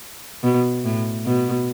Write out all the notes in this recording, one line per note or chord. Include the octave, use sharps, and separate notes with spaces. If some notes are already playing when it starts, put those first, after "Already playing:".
B2
A2
B2